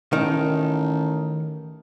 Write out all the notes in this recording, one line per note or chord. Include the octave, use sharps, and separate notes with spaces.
A1 D#3